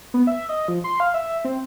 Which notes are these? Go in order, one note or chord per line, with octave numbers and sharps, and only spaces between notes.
B3
E5
D#5
F3
C6
F5
E5
C4